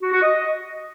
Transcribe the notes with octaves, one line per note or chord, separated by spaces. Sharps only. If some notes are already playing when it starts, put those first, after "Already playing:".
F#4
F#4
D#5